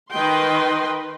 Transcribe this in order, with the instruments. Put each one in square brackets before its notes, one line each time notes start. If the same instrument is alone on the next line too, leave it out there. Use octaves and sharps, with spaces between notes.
[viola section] D#3 B4 D#5 G5 C6